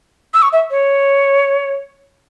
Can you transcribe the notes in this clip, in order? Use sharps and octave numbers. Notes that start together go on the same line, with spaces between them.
E6
C#6
E5
C#5